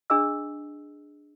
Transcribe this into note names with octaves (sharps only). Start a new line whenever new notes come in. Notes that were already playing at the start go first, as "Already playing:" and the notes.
D4 G#4 D#5 E6